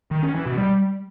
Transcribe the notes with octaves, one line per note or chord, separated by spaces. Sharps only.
D#3
C#4
E3
B2
G3